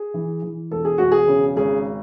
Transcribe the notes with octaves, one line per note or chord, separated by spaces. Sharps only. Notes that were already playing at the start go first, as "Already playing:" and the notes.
Already playing: G#4
E3
E3
E1 A4
G#4
E1 F#4
G#4
C#3
G#1 G#4